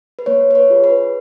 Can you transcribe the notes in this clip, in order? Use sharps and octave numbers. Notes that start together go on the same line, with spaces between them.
B4
A#3 C#5
B4
C#5
F4 G#4
B4